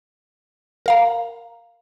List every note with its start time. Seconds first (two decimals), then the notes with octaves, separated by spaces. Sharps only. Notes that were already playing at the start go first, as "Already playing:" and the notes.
0.86 A#4 F5 A#5